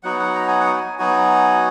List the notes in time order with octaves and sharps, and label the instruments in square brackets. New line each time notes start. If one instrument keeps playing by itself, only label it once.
[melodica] F#3 B3 D#4 F#4 F#5
F#5
A#5
G#5
F#5
G#5
F#3 B3 D#4 F#4 G#5